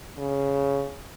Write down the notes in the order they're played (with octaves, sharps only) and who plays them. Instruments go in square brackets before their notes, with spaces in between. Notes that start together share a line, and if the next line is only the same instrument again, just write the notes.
[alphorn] C#3